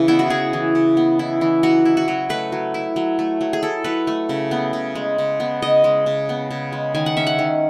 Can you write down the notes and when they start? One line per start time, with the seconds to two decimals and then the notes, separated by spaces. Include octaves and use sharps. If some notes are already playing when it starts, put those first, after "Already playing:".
Already playing: C#3 E3 B4
0.08 B3 E4
0.19 F#4
0.30 E4 G#4
0.53 E3
0.75 C#3
0.97 B3
1.19 E4
1.41 E3
1.63 F#3 F#4
1.85 E4
1.97 F#4
2.08 F#3
2.29 A3 B4
2.52 F#3
2.74 E4
2.96 F#3
3.19 A3
3.41 F#3
3.53 G#4
3.63 E4 A4
3.84 F#3 B4
4.07 A3
4.29 C#3
4.51 B3
4.73 C#3
4.95 G#3
5.18 C#3
5.40 B3
5.62 C#3 D#5
5.84 G#3
6.06 C#3
6.29 B3
6.51 C#3
6.73 G#3
6.95 D#3 G#5
7.06 F#5
7.17 C#4 E5
7.27 F#5
7.39 D#3